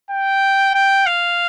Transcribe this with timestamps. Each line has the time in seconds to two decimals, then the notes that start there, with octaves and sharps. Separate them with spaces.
0.10 G5
0.74 G5
1.06 F5